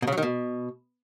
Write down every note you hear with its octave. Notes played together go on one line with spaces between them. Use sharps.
B2
C#3
F#3
D#3
B2